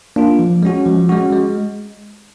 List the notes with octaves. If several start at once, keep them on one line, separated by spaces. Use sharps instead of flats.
A#3 D4 F4
F3
G#3 C#4 F#4
F3
G#3 C#4 F#4
G#3